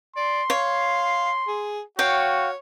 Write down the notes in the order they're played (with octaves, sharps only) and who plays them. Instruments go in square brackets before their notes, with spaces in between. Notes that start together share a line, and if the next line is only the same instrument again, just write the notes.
[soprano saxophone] D5 [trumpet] C6
[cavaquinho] C#5 [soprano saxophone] F5
[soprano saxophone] G#4
[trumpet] F#4 [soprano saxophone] C#5 [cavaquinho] F5 G5